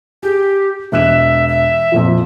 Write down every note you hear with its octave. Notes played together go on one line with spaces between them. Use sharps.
G4 G#4
E1 E5 F#6 E7
E5
F2 A#2 F3